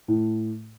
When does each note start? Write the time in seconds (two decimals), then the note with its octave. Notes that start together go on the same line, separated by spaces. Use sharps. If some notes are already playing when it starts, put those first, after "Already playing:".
0.08 A2